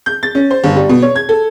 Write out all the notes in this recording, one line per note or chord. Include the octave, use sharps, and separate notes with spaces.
G6
A6
C#4
C5
G1
G3
B2
C#5
G#6
A4